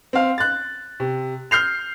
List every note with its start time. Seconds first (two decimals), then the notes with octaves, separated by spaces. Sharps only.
0.13 C4 F5
0.38 F#6 A6
1.00 C3
1.51 F6 G6 C7 F7